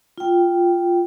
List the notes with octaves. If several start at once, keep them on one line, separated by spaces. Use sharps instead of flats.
F4 G5